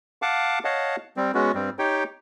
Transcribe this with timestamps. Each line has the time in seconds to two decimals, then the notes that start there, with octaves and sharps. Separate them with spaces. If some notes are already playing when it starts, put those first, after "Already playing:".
0.22 F5 F#5 A5 D6
0.65 C#5 D#5 F5 F#5 A5
1.17 G3 C4
1.35 G#3 B3 C#4 F#4
1.55 G2 G3 C4
1.79 D#4 G4 C#5 G5